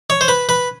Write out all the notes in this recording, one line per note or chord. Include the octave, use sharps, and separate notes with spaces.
C#5
C5
B4
B4